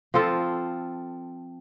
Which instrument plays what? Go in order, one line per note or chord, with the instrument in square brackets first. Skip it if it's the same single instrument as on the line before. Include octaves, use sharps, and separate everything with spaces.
[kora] F3 C4 F4 A4